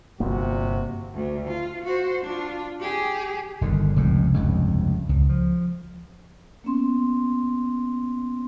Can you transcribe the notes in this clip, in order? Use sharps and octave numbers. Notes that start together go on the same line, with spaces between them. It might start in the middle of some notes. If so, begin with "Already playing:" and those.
G1 C3 A#3 F#4
D2
F4
F#4 C5
D4 F4
G4 G#4
G1 D3 D#3
F1 C#2 A2
F1 C#2 G2
C#2
F3
A#3 B3 C#4 C6